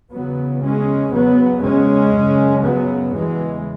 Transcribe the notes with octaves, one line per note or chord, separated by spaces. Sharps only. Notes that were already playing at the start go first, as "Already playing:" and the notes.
E2 C#3 F#3 B3
G#3 C#4
E2 C#3 F#3 B3
G#3 C#4
F#2 C#3
F#3 B3
E2 C#3 E3 G#3